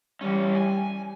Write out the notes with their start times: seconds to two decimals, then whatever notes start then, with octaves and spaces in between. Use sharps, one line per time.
0.21 E3 G3 C#4
0.55 G#5